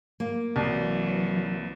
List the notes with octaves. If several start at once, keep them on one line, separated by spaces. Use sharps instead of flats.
A#3
C2 E3 F#3